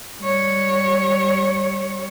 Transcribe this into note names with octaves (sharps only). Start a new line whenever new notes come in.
G3 C#5